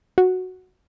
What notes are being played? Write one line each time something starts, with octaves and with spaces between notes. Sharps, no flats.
F#4